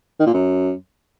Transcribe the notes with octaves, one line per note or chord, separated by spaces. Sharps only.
D#3
A#2
F#2